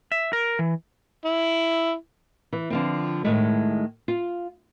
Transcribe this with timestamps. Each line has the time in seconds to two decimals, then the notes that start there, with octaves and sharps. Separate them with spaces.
0.12 E5
0.33 A#4
0.59 E3
1.25 E4
2.53 E3
2.70 D3 F3 C4
3.24 A2 D#3 G#3 A3
4.08 F4